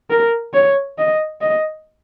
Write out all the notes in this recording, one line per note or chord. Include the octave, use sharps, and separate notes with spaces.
A#4
C#5
D#5
D#5